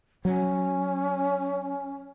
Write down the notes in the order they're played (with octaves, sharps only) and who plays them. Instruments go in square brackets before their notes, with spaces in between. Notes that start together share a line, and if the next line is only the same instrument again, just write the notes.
[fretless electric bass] F#3 [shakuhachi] C#4